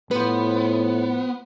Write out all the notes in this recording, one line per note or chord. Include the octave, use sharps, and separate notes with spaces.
A2 F3 B3 B4